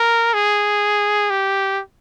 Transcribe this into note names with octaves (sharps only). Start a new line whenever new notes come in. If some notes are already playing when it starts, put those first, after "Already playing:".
Already playing: A#4
G#4
G4